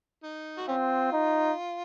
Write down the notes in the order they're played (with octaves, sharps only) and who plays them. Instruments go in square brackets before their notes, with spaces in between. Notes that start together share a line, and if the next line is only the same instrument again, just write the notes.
[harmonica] D#4
F#4
[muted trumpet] C4 [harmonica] C#4 F4
[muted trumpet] D#4